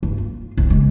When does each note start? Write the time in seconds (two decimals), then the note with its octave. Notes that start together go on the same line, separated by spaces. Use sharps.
0.03 G2
0.18 F4
0.58 B1 F#3
0.70 C#3 G#3